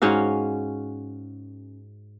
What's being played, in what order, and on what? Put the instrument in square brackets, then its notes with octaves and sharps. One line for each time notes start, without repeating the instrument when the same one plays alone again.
[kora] G#2 C#4 F#4 F5